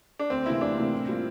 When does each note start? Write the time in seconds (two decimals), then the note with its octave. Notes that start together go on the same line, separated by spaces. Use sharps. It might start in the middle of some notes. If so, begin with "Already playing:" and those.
0.19 D4
0.30 D2 C4
0.46 C3 E3 A#3 E4
0.61 D2 D4
0.77 C3 E3 A#3
0.93 A2
1.08 G3 A#3 F4